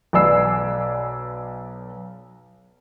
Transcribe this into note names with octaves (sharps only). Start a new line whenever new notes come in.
B1 B4 D5 G#5 E6 C7